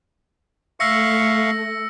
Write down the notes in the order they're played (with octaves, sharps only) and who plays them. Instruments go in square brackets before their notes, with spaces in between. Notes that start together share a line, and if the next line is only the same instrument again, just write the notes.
[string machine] A3 [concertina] E5 F5 C#6 [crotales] E6 A#6 C#7